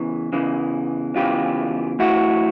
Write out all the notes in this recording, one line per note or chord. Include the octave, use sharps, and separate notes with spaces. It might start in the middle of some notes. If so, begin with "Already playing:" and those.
Already playing: E2 C#3 E3
E2 C#3 E3
E2 C#3 E3 F4 G4
A2 E3 E4 F#4